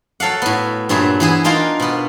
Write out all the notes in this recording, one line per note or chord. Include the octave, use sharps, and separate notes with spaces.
F#3 A4 F5 F#5
A2 B3
G2 A#2 F#3 G#4 E5
E3 B3 G#4
D4 D#4 F4 A#4 F5
B2 B3